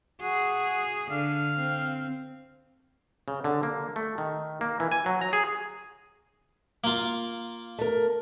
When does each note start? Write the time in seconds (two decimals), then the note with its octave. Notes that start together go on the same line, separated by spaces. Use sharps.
0.21 F#4 G#4
1.11 D3 F5
1.57 C4
3.28 C#3
3.44 D3
3.63 A#3
3.96 A3
4.18 D#3
4.61 A#3
4.80 E3
4.92 G#5
5.06 F#3
5.21 A#5
5.33 G#4
6.84 A#3 F4
7.79 A3 A#4